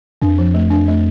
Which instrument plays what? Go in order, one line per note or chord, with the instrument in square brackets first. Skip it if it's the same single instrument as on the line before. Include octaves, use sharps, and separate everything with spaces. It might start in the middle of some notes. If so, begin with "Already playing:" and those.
[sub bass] F2 [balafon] D4
[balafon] F3
A3
D4
A3